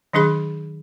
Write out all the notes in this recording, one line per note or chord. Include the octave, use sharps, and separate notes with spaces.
D#3 F#3 D4 G#4 B5